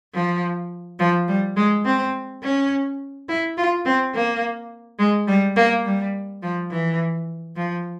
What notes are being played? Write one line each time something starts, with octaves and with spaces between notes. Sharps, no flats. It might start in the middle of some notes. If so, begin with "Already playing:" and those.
F3
F3
G3
G#3
C4
C#4
E4
F4
C4
A#3
G#3
G3
A#3
G3
F3
E3
F3